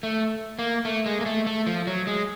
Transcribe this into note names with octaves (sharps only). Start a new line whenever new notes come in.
A3
A#3
A3
G#3
A#3
A3
A3
F3
F#3
G#3